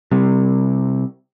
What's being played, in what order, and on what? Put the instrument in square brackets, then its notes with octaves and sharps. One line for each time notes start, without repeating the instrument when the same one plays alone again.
[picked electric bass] C3 G3